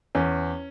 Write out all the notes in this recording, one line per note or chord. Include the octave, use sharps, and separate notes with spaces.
E2 C#4